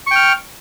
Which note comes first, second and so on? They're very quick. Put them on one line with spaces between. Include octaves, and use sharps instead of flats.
C#6 G5 F6